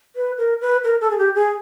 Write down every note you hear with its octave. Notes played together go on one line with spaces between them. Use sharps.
B4
A#4
B4
A#4
A4
G#4
G4
G#4